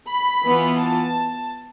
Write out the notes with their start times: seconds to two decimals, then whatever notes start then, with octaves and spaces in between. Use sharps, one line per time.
0.10 B5
0.45 E3 B3 F4
0.79 A5